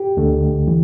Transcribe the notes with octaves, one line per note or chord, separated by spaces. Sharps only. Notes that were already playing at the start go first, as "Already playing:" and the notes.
Already playing: G4
D2 D3 A3
E3